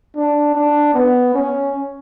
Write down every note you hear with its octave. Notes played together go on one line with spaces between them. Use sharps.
D4
D4
B3
C#4